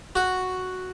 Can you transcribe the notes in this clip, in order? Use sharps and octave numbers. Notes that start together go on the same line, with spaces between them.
F#4